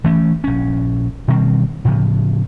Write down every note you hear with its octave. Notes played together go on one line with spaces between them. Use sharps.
E3 A3 C#4
A#1 C#4
B2 D#3 G3 C4
A2 C#3 F3